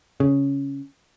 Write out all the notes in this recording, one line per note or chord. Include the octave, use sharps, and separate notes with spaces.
C#3